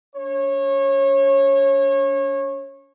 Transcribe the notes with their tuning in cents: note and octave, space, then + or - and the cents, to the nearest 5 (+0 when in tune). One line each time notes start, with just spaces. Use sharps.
C#4 +45 C#5 -25